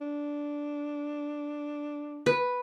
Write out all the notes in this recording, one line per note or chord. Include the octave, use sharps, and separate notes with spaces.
D4
B4